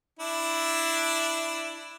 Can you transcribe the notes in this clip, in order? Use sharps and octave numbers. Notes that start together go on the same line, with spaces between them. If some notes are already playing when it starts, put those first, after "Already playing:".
D4 E4